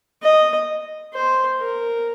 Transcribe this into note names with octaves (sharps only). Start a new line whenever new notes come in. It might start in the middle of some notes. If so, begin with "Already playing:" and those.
D#5
C5
A#4